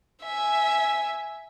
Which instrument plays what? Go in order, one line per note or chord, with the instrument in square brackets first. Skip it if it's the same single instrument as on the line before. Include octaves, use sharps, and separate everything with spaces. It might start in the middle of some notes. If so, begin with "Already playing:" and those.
[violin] E5 G#5